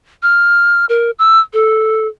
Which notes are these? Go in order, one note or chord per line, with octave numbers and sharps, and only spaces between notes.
F6
A#4
E6
A4